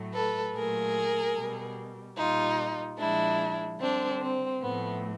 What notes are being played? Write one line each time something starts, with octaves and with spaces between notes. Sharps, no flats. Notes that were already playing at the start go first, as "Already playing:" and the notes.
Already playing: A2 F#3 A3
A4 B4
A#2 F#3 A3 G#4 A#4
B2 G3
A#2 G3 D#4 F4
A#2 F3 G#3 D4 E4
D3 G3 C4 D4
C4
A2 F3 A3 B3